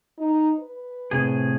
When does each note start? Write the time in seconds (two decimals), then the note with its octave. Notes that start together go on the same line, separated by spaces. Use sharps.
0.18 D#4
0.59 B4
1.11 A2 C3 G#4